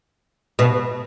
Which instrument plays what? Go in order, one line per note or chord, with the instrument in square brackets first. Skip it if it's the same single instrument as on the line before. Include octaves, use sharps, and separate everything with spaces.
[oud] B2